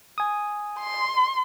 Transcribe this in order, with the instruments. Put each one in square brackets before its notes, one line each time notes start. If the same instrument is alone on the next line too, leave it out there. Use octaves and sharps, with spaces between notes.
[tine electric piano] G#5 D#6
[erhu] C6